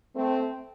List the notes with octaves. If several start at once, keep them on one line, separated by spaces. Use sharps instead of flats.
A3 C4